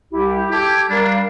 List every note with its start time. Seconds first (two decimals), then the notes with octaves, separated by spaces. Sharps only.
0.11 C2 E4 G4
0.51 G4 A4 D6 G#6
0.90 G3 D4 A#4 F5